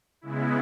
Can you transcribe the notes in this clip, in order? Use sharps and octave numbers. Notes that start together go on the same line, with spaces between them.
C#3 G#3 B3 E4